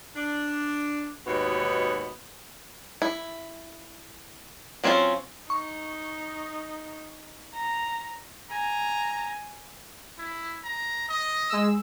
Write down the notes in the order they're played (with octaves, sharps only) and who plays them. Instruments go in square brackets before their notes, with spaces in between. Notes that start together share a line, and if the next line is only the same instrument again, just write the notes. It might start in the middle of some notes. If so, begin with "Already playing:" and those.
[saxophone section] D4
D#2 G#2 B2 B3 F#4 C#5
[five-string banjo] E4
F#3 C4 C#4 E4 F4
[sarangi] D#4 [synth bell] C#6
[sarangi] A#5
[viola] G#5 [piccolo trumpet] A#5
[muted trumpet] E4
A#5
D#5
[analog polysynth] G#3 E6